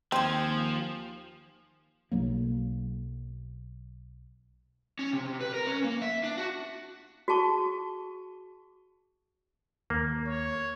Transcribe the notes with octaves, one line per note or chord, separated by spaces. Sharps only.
D#2 F3 C4 C5 G#5
B1 F#3 A#3
C#4
C3
C3
B4
A#4
C#4
A#3
E5
D4
F#4
F#4 G#4 A5 C#6
D#2 A#3
C#5